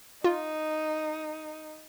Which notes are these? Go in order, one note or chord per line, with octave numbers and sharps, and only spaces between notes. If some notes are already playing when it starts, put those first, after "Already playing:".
D#4 F4